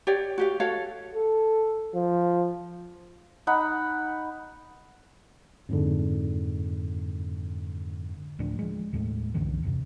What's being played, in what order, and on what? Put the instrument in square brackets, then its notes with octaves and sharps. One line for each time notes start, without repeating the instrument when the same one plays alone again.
[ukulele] G4 C#5 D5 G5
F#4 G4 F5
F#4 A4 C#5 F5
[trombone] A4
F3
[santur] D#4 F#5 B5
[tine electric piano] F2 G#2 D3
[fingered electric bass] D2 A2 F3 D4
F3 G#3
D#2 A2 G#3 A3
C2 F#2 D3 E3
D#1 F#2 C3